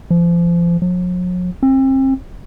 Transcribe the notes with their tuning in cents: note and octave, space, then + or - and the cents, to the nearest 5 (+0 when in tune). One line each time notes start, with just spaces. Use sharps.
F3 -30
F#3 -45
C4 +35